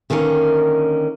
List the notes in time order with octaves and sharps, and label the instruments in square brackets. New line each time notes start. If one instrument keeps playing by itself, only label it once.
[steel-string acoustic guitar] D3 D#3 A#3 C#4 A#4